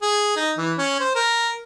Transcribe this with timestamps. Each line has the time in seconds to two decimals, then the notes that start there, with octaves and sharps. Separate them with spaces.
0.02 G#4
0.37 D#4
0.58 E3
0.78 C#4
1.00 C5
1.15 A#4